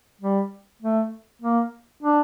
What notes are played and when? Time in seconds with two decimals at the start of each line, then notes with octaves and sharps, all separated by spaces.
0.21 G3
0.82 A3
1.42 A#3
2.03 D4